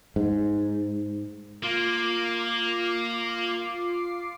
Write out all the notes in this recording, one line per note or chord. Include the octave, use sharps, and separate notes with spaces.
G#2
A#3 F4 D6 C7